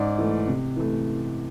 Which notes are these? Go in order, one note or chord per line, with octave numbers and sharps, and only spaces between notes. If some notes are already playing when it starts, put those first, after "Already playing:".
Already playing: G#2 D5
E3 A3
C3
E3 A3